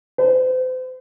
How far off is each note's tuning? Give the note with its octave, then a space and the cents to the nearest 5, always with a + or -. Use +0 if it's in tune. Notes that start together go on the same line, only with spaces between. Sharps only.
C5 -40